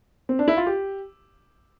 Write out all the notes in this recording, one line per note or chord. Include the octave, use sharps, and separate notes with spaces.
C4
D4
E4
F4
G4